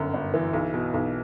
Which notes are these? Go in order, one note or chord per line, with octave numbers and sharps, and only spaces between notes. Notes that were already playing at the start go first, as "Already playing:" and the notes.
Already playing: G1 F#2
G1
E3
B1
B2
B1